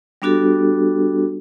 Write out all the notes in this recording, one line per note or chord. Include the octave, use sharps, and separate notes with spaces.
G3 B3 D4 F#4 G4 A4